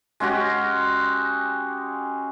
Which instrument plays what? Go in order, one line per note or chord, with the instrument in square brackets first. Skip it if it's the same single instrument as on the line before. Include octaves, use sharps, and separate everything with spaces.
[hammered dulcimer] G#3 C#4 F#4 G4